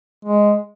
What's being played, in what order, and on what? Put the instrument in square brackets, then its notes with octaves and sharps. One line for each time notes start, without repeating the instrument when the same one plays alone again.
[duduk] G#3